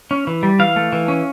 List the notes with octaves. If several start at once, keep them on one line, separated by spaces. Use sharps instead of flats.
C#4
E3
G3
E3 F5
A3
E3
C#4